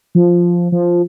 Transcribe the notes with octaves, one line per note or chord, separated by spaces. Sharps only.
F3
F3